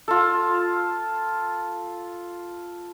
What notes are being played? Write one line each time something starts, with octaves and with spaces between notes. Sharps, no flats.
F4 A4